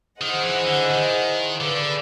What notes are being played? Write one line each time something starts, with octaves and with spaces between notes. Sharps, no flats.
D#3 E4 G#4 C5 D#5 F#5
E3
D3
D#3
D3 G#4 B4 D5 F5